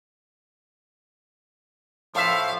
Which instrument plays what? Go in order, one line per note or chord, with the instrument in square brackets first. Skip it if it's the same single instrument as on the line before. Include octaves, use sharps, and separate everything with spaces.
[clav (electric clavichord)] A2 E5 [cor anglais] F3 [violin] F5